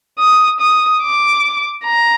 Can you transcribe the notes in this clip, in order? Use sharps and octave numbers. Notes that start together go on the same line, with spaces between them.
D#6
D#6
D6
A#5